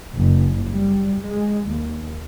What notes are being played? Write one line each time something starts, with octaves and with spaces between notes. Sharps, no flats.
F#1
G3
G#3
D#2